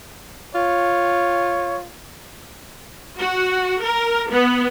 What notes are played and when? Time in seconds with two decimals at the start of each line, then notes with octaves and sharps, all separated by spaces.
0.55 F4 C#5
3.19 F#4
3.81 A#4
4.31 B3